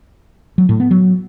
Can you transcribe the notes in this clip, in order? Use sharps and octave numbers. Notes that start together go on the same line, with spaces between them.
F#3
A2
B3
F#3